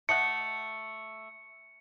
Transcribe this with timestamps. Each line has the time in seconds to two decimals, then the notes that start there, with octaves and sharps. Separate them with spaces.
0.09 A3 D#5 F#5 C#7